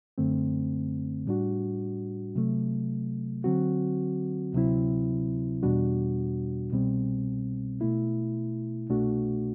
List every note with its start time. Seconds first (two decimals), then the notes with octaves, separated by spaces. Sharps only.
0.18 F#2 D3 A3 C4
1.26 A2 G3 D4 F#4
2.35 C3 F#3 A3
3.44 D3 F#3 C4 F#4
4.53 D2 C3 F#3 C4 E4
5.63 E2 B2 G3 D4 F#4
6.71 C2 B2 G3 C4
7.81 B2 A3 E4
8.90 C2 B2 A3 D4 F#4